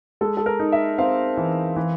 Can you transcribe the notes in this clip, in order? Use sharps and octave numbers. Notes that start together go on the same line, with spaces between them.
G#3 A4
A4
A#4
D#4
E5
C4 F5
E3
E3